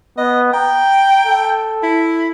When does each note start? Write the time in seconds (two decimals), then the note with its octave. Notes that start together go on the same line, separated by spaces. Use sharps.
0.18 B3 D#5
0.53 G5 A#5
1.26 A4
1.83 E4